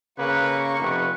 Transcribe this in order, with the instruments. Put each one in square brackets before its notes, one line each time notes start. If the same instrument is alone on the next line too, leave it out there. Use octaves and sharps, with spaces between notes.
[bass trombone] C#3 [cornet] A#3 [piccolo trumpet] B4 [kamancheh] C#6
[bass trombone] F1 [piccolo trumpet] B4